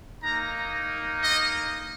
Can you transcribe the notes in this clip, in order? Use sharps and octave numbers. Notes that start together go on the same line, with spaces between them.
A#3 D#4 A#5
D#5